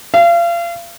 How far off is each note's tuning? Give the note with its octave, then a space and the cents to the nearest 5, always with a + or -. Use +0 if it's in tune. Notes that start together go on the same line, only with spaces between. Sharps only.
F5 -35